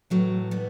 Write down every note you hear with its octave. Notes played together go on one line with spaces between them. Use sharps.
A2 E3 F#3 A3
G3 B3